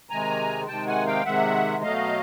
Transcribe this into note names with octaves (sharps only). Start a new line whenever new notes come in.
C3 D#3 G#3 G#5 A#5
C3 D#3 G#3 G5 A5
F#5 G#5
F5 G5
C3 D#3 G#3 E5 F#5
B2 F#3 A3 D#5 F5